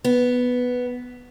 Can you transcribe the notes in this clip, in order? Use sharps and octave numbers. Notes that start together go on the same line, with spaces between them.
B3